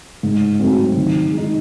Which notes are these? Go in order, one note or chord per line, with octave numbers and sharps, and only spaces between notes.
G#2
F#3 A3 C4
D#3
G#3
D#4